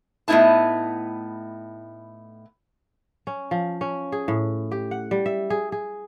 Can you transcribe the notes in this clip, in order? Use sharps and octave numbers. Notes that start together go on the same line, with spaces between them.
A2 A3 B3 D#4 E4 A5
C#4
F3
C#4
G#4
A2
G4
F#5
G3
E5
G#4
G#4